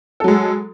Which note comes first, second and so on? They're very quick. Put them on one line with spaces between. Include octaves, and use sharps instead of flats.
A4 F#3 G#3